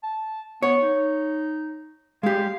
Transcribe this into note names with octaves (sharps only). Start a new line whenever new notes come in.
A5
B3 C#5
D#4
G#3 G4 F5